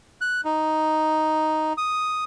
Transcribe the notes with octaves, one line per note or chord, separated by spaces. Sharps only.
F#6
D#4
D#6